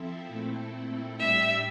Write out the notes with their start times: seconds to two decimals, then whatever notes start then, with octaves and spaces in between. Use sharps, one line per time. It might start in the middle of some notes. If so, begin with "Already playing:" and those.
Already playing: F3 C4 E4 A4 E5
0.27 A#2 A3 C4 E4 A4
1.19 A2 G3 D4 G4 D5 E5